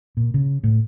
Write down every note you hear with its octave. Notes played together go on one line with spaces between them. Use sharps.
A#2
C#3
A2